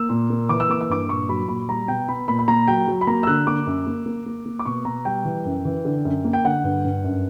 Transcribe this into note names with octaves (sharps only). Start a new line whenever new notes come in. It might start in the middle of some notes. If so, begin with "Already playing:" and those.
Already playing: A#3 E6
A#2
A#3
E3 D6
E6
A#3 D6
E6
G2 D6
A#2 C#6
F#3 B5
A#2 B5
G3 A#5
B2 G5
B3 B5
A#2 B5
B5
A#3 A#5
F#3 G5
F#3
B5
A#3 A#5
E6
D3 F#6
A#3 D6
F#2
A#3
A#3
A#3
A#3
D6
B2 C#6
B2 A#5
G3 G5
E3
F#2
E3
D3
F#2
A#3
G5
D3 F#5
G2
G2
F#2